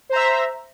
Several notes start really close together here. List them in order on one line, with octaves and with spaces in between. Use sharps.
C5 A#5 E5